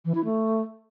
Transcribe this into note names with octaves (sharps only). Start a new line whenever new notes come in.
E3
E4
A3